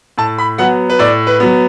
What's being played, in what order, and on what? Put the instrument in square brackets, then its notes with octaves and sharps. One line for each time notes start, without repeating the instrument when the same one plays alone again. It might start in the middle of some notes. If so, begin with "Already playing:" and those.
[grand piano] A2 A5
B5
F#3 B3 F#5
B4
A2 D5
B4
F#3 B3